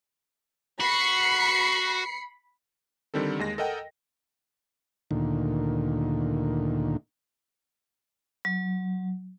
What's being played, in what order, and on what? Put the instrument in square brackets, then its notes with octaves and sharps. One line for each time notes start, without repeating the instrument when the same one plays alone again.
[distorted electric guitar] F#4 [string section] B5 C7 C#7
[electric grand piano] D3 D#3 G3 C4 A4
D#2 G#3 A#6
A4 A#4 D#5 F#5 G5
[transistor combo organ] D2 A#2 D#3
[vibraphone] F#3